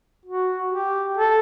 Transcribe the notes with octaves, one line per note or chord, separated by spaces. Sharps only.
F#4
G4
A4